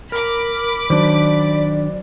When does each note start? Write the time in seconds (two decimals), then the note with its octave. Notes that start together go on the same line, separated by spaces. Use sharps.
0.12 A#4 B5 D6
0.90 D#3 F#3 D4 C5 D5